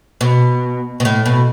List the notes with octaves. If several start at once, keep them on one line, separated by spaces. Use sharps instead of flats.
B2
B2
A2
B2